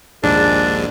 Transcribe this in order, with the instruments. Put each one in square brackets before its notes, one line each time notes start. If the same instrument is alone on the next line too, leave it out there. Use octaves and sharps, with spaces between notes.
[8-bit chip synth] A#1 D#2 G#2 [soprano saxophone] D4 [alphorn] G#4